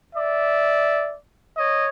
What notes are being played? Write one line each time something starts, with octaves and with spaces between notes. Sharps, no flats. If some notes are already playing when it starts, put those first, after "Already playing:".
D5 E5
C#5 D#5